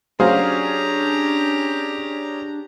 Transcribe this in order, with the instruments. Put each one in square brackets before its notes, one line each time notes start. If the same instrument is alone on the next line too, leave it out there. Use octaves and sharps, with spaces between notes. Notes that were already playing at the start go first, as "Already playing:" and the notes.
[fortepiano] F#3 C5 F5 [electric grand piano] C#4 G#4 [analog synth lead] D4 [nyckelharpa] G4 A#5